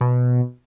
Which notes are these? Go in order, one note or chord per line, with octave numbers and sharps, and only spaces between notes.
B2